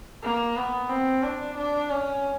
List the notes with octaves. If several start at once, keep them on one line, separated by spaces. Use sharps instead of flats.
A#3
B3
C4
D4
D4
C#4